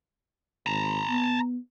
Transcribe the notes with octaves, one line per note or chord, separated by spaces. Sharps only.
G#1 A5 A#5
B3